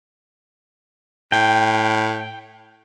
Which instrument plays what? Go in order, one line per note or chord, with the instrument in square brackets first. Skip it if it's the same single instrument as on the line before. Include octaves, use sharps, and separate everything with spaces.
[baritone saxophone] A2 [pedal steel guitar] G5